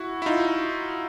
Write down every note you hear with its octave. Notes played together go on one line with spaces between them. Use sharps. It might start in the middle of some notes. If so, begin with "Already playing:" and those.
Already playing: E4 F#4
E4
D#4 F4